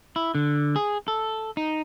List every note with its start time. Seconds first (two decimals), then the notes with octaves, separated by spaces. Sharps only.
0.16 E4
0.35 D3
0.76 G#4
1.08 A4
1.57 D#4